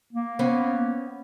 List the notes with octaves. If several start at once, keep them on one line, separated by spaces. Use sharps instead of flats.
A#3
B3 C#4 C5